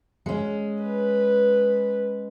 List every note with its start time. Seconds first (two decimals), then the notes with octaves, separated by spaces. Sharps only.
0.26 G#3 C#4
0.82 B4